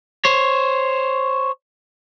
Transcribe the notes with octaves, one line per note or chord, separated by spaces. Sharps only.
C5 C#5